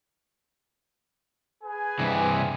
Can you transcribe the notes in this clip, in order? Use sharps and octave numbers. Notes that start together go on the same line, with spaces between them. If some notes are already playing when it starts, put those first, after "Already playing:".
G#4 B4 G#5
G2 C3 E3